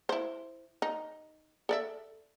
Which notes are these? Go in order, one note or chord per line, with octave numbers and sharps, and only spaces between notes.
E4 C5
D#4
A4 D5 E5